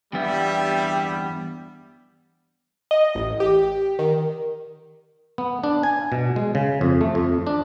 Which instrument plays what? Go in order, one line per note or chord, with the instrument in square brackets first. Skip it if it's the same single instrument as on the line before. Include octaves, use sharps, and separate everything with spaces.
[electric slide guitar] E2 G2 B3 [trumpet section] G3 [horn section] G4 E5
[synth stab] D#5
A1
G4
D#3
[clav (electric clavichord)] B3
D4
G#5
B2
G#3
C#3
F2
A3
F2
D4